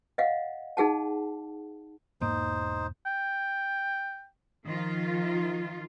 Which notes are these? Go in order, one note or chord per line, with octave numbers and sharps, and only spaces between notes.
D#5 F5 F#5
D#4 G#4 F#5 A5
E1 G#2 A#3 D#4 C5
G5
D#3 F3 F4